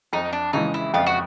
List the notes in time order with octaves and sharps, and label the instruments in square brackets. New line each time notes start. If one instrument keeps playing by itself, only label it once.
[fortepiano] F2 [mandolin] D#4
[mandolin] D4
[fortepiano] C#3 E3 G#3 [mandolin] D#4
[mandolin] E4
[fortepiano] F2 [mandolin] F4
[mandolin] F#4